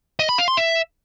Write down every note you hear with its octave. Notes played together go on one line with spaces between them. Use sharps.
D#5
B5
F5
C6
E5